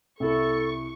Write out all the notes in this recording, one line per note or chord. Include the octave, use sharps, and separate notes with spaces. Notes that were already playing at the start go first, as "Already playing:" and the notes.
C2 E4 A4 C#6